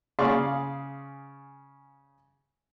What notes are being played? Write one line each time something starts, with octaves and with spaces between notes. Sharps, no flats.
C#3 G#4 D5 F5 C6 C#6